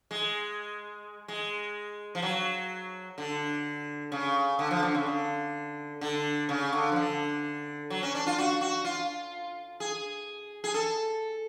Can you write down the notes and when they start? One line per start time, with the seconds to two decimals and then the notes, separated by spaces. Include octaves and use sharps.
0.11 G#3
1.28 G#3
2.15 F3
2.22 F#3
3.18 D3
4.12 C#3
4.59 D3
4.71 F3
4.83 D3
4.94 C#3
5.06 D3
6.01 D3
6.49 C#3
6.73 D3
6.92 F3
6.96 D3
7.90 F#3
8.03 C#4
8.15 D4
8.27 F4
8.38 F#4
8.61 F#4
8.85 F4
9.80 G#4
10.64 G#4
10.74 A4